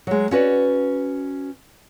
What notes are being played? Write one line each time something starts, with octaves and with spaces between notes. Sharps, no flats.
F#3 G#3
C#4 F#4 B4 D5